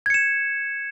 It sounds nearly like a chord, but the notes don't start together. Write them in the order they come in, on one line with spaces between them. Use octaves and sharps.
G#6 C#7 E7